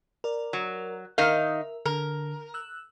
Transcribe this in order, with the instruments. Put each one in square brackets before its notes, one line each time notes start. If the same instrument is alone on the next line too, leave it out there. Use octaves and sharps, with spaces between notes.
[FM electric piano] A#4 D5
[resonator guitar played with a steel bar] F#3
[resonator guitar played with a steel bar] D#3 D#4 F5 [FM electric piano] A#4 E5
[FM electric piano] D3 [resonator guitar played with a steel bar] A#4
[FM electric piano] E6 F#6